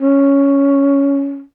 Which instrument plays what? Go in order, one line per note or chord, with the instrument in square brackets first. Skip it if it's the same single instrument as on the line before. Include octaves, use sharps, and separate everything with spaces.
[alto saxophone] C#4